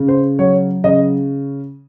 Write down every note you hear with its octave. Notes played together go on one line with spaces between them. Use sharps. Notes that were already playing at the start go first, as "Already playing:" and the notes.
Already playing: C#3
C5
F#3 C#5
C#3 D#5